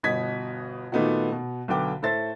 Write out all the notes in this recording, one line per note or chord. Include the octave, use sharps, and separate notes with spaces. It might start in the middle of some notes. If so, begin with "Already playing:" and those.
G1 B2 D#5 G#6 B6
A#2 D#3 A3 B3 D#4 F#4
B2
B1 D3 B3 G5 D6
A2 A4 C5 E5 A6